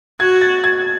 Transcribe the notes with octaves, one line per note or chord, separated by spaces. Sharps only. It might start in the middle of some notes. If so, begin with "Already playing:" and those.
F#4 G#6
A6
G#6